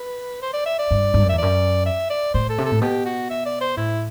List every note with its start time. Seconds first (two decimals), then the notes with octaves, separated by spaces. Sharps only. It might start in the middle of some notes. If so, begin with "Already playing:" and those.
Already playing: B4
0.42 C5
0.54 D5
0.66 E5
0.79 D5
0.91 G2
1.14 G2
1.23 F#2
1.29 E2 E5
1.38 F#2 D5
1.86 E5
2.10 D5
2.34 A2 C5
2.49 A4
2.58 C3
2.65 A4
2.71 A2
2.81 B2 G4
3.05 F#4
3.30 E5
3.46 D5
3.61 C5
3.77 A2 E4